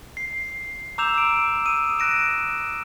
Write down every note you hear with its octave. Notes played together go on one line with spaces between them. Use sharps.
C7
A#5 D6 E6 G6 E7 F7
E6 D7
D#6 E6 D#7
F#6 A#6 D7 E7